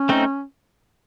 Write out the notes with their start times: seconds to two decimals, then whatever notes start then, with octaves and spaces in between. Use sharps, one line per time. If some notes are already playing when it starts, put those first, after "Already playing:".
Already playing: C#4
0.09 A3 C4 D#4